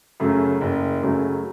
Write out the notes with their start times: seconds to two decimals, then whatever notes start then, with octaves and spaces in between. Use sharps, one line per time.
0.20 F#2 C#3 F#3 A3
0.61 F#1
1.03 F#2 C#3 F#3 A3